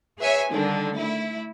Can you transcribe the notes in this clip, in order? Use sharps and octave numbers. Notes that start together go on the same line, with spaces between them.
G#4 B4 C#5 E5 G#5
D3 D#3 G3 D4
A3 E4